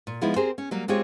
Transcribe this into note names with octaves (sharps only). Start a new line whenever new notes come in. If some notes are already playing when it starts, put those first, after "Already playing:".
A#2
F3 G#3 B3 D#4 E4
C4 G4 G#4 A#4 C5
C#4
F#3 G3 A#3
G#3 C4 F4 G4 G#4 C#5